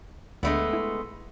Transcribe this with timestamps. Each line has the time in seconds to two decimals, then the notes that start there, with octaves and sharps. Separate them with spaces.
0.43 D2 D3 G#3 A3 B3
0.73 E4